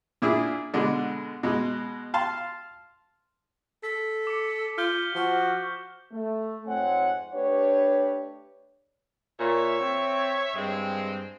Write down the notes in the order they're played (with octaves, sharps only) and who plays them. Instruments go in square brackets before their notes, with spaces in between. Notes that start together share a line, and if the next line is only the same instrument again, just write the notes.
[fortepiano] A#2 D4 E4 G#4
B2 D3 G#3 D4
B2 G#3
F5 A5 C6
[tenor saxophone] A4 [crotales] B6
[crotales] D6 C#7
[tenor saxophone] F4 [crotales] F6 G6 G7
[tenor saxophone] F3 [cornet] F#4
[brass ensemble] A3
F2 G#2 C4 C#5 F#5 G#5
A3 D4 G4 B4 C#5
[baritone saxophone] A#2 [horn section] C#5 E5
[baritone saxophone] C4
[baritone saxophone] G2 [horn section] G#3 C4